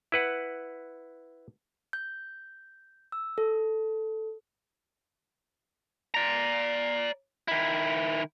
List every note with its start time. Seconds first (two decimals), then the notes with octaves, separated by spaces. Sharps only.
0.12 E4 B4 F#5
1.93 G6
3.12 E6
3.38 A4
6.14 D5 A#5
7.48 D#3 E4